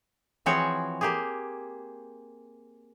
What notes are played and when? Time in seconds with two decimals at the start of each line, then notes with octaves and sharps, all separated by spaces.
0.46 E3 F3 C4 F#4 G#4 C#5
1.01 A#3 G4 G#4